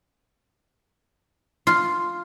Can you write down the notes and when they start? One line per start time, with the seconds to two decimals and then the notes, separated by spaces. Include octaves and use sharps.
1.67 F4